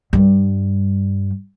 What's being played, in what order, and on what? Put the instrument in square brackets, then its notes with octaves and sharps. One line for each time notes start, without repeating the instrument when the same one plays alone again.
[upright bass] G2 G3